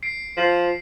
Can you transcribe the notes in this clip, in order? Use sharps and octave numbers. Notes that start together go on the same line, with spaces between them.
C7 D7
F3